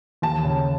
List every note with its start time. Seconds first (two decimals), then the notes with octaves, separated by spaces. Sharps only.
0.22 D#2 A5
0.45 C#3